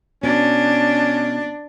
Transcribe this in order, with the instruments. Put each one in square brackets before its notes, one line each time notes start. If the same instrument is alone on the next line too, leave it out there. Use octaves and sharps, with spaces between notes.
[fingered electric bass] B2 [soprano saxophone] C#4 [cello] D4